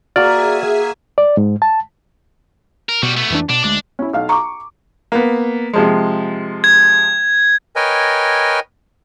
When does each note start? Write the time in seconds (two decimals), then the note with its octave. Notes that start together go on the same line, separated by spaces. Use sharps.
0.16 A#3 F#4 G#4 D5 E5 G#5 A#5 F6
1.18 D5
1.37 G#2
1.62 A5
2.89 A#4
3.03 B2 G3 F#4
3.16 A3 B3
3.30 F2 E3 D4
3.49 B2 D4
3.64 D2 G#3 D4
3.99 C#4 E4
4.13 B1 F5
4.29 A#5 C#6 D6
5.12 A#3 B3
5.73 C3 F3 G#3
6.64 G#6
7.76 A#4 B4 C#5 D#5 G5 G#5